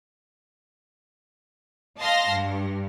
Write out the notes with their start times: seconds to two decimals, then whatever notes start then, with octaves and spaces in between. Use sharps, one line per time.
2.01 D#5 F5 A5 C6 A#6
2.32 G2